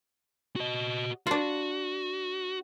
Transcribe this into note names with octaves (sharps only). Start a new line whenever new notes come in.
F#4 D#5
D4 F4 F#4